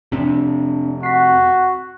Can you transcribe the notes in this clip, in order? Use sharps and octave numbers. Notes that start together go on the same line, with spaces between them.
F2 C3 C4 D4
F#4 B6 C7